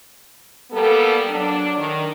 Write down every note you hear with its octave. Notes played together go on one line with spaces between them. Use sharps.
G3 A#3 B3 A4
F#3 D4
D#3